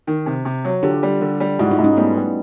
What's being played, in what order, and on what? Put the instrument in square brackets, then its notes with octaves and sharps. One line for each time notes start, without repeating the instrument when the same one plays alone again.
[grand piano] D#3
C3
C3
F#3
[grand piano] D3 [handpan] F4 G4
[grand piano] G3
D3
G3
[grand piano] G#2 [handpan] E4 F#4
[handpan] D#4 F4
[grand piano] G#2
[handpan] C#4 D#4
[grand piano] G3 [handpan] A3 B3
[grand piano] G3